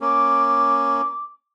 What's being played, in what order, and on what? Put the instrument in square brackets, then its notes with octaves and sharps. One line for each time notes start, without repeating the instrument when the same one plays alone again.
[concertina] A#3 C#4 [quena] D6